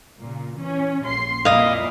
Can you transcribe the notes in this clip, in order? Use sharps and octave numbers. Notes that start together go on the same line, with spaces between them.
A#2 C#3
E3 C#4
A#1 C6 C7
F2 A#2 E4 D#5 F5